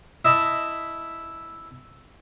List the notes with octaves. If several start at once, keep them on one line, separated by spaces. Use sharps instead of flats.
E4 D#5 A5 B5